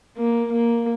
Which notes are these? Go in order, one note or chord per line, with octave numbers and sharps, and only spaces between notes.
A#3
A#3